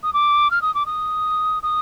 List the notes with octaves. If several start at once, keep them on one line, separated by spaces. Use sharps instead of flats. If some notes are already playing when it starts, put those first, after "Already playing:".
D#6
D6
F6
D#6
D6
D#6
D#6